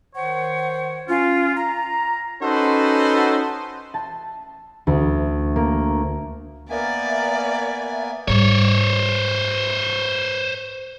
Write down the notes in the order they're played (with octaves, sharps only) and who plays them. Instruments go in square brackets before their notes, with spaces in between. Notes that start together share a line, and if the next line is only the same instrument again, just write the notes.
[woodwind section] D#3 C5 C#5 F#5
C#4 F4
A#5
[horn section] C#4 D#4 F#4 A4 B4 C5
[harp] A5
D2
A#3
[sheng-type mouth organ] A#3 B3 G#5 [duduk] A#4 [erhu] D5 [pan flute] E5
[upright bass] G#2 G3 [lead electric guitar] C5 C#5